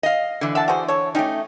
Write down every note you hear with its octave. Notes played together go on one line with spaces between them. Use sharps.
D#5 F5
D3 E3
E5 F#5 A5
F#4 G#4 C5
A4 C#5
A3 C#4 D#4 G4